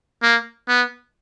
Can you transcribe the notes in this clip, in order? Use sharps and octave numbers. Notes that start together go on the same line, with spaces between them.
A#3
B3